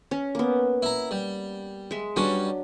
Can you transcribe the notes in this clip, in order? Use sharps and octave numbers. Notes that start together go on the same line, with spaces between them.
C#4
A#3 B3
E4 A#5
G3
G#3 E5
F#3 G3 C#4 D4 B4